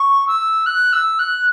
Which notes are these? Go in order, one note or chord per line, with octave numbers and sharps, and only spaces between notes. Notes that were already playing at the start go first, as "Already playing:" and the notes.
Already playing: C#6
E6
F#6
E6
F#6